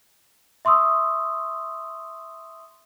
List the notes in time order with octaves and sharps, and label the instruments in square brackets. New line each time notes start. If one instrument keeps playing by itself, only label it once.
[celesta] E5 C6 C#6 D#6 E6